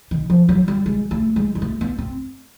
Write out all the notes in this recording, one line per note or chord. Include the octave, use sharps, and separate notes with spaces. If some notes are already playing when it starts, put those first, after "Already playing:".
D#3
F3
F#3
G3
G#3
A3
G#3
G#3
A3
B3
C4